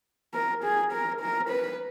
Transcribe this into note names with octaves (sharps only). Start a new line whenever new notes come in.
A#4
G#4
A#4
A#4
B4